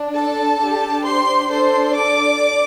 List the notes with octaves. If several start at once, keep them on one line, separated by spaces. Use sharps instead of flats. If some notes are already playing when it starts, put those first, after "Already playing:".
Already playing: D4
A4 A5
D4 G4
C5 C6
D4 A4 C5 C6
D5 D6